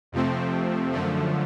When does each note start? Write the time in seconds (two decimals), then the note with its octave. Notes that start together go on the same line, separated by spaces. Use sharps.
0.12 F2 C3 F3 A3 C4
0.93 F#2 D3 F3 A3